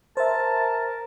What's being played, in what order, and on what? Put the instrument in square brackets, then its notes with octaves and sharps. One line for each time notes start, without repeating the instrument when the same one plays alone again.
[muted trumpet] A#4 [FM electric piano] C5 E5 [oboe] A5